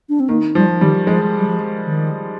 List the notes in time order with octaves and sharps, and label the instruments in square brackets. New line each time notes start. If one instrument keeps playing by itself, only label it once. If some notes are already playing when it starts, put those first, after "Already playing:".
[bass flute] D4
C4
[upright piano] D#3 [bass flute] A#3
[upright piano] F3 [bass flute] G3
[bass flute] D#3 [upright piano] G3
[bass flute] F3 [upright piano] G#3
[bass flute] G3
F3
D#3